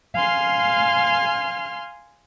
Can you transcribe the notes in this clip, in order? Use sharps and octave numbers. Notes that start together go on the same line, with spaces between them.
F5 G#5 C6 F6